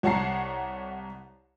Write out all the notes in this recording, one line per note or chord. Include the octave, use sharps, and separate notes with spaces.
C2 C#5 F#5 A5 A#5 C7